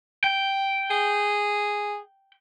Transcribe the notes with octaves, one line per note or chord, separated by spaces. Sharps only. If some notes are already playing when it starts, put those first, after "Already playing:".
G5
G#4